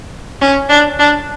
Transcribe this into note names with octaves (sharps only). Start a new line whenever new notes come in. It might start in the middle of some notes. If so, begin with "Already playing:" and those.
C#4
D4
D4